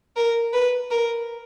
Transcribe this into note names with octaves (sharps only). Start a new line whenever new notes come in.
A#4
B4
A#4